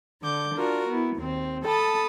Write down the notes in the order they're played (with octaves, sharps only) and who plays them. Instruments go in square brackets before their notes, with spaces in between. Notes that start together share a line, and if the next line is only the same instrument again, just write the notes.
[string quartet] D3 D6 G6
D4 F4 F#4 A#4
B3 E4
D#2 C4
A4 A5 B5 D#6